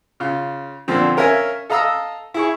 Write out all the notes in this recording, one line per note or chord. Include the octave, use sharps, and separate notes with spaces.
C#3 F4
A#2 D3 F3 C4
C#4 A#4 E5 F5 G#5
A4 D#5 F5 A#5 D#6 E6
E4 G#4 C#6